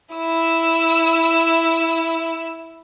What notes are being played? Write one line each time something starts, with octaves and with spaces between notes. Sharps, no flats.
E4 E6